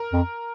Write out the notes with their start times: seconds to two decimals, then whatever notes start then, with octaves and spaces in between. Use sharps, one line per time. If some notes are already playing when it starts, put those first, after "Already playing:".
Already playing: A#4
0.13 F2